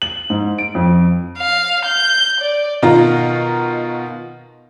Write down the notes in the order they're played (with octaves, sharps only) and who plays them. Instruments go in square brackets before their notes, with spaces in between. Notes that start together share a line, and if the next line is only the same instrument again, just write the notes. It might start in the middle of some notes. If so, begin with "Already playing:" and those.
[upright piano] F#7
G#2
D7
F2
[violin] F5
G6
D5
[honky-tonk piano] B2 D#3 F4 A#5